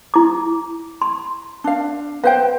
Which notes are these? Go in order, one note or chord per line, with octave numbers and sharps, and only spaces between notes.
E4 D6
C6
D4 F5
B4 C5 F5 G5